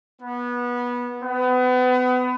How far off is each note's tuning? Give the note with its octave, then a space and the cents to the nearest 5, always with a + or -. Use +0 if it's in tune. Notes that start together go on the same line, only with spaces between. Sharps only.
B3 -20
B3 +30